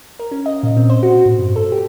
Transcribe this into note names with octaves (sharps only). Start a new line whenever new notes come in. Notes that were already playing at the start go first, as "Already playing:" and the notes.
A#4
C#4
D#5
A#2
C4
C5
F#4
B2
A2
G2
A4
G4